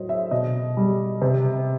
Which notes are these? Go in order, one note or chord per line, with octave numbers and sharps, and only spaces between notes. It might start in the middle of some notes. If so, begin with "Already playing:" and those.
Already playing: A2 F#3 C5 D#5
E5
B2 D#5
G3
C3